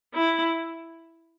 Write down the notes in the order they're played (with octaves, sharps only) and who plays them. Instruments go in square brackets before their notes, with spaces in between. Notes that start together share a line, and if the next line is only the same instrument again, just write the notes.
[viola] E4